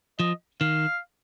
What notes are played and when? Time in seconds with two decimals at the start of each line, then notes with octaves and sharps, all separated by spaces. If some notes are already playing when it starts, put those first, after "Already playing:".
0.20 F3 D#5
0.61 D#3 F5